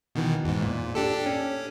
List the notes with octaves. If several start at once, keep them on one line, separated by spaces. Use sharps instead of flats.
B2 D#3 E3
E2 G#2
A#2
D4 G4 A4
C#4